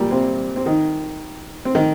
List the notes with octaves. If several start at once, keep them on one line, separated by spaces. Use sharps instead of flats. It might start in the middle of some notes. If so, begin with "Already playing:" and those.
Already playing: A#2 G3 A#3
C3 C4
C4
D#3 D#4
C4
D#3 D#4